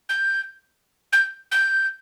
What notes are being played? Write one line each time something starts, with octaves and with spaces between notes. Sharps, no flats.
G6
G6
G6